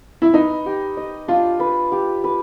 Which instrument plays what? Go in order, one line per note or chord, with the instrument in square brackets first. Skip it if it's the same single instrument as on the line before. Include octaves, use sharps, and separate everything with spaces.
[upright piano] E4
[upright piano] D#4 [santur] B4
[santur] G4
D#5
[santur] D4 [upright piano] F4
[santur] B4
G4
B4